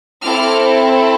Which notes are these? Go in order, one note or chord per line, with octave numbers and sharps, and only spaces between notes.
C4 E4 A4 D6 F6